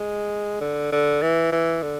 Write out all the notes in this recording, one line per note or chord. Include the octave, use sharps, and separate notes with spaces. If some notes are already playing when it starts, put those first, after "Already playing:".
Already playing: G#3
D3
D3
E3
E3
D3